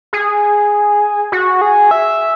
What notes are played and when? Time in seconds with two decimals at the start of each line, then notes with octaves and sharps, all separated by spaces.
0.13 G#4
1.32 F#4
1.61 G#4
1.91 E5